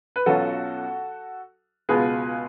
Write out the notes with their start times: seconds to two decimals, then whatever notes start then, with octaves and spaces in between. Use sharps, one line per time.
0.16 B4
0.26 B1 B2 F#3 C#4 F4 F#4 A4
1.89 C#2 B2 G#3 B3 F4 G#4 B4